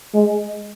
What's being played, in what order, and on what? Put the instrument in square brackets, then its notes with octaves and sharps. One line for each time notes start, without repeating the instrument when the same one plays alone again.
[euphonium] G#3